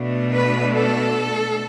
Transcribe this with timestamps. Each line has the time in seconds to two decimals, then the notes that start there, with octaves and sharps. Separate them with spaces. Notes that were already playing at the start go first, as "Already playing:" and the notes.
Already playing: B2 A3 D4
0.33 B4
0.76 A4